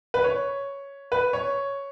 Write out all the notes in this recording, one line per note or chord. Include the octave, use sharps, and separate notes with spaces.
B4
C#5
B4
C#5